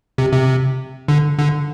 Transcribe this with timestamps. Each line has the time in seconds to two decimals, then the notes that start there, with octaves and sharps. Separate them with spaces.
0.18 C3
0.33 C3
1.08 D3
1.39 D3